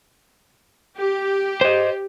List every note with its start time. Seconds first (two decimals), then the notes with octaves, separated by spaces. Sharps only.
0.97 G4
1.61 C5 D#5